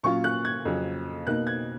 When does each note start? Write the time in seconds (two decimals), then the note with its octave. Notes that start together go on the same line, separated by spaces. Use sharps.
0.03 A#2 F#3 C#4 F4 C#6
0.24 F#6
0.45 G#6
0.65 F2 C#3 F#3 C#4
1.26 B2 A#3 D#4 F#6
1.47 G#6